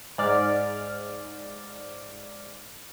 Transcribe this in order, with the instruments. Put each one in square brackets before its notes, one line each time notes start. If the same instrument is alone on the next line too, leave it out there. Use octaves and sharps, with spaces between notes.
[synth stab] G#2 D5 F6